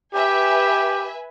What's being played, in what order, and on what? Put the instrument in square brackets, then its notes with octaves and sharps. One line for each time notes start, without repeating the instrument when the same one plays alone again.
[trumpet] G4 [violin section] B4 E5 G#5